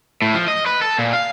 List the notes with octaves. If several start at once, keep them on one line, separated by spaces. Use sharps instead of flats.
A2
F3
D#5
B4
A4
A#2
F5